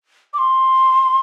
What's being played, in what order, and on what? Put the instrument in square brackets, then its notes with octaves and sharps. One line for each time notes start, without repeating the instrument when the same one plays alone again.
[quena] D6
C6